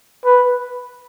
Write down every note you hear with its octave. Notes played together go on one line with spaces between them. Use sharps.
B4